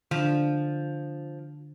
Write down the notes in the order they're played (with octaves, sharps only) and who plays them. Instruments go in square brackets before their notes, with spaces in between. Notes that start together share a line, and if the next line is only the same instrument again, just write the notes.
[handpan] D3 [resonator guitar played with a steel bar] F3